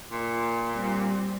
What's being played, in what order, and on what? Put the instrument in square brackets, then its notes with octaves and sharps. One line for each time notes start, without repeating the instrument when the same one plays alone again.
[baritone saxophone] A#2
[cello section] G3 C4